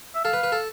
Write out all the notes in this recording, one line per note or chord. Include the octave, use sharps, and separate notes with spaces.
E5
A4 F5
B4
B4
A4